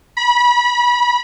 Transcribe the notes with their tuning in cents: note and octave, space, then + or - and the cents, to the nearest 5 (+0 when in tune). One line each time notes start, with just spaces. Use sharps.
B5 -30